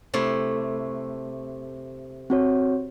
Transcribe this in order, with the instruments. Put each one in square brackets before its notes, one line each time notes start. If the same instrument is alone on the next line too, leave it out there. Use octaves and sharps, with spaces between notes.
[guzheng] C3 A3 E4
[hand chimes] C4 F#4 C#5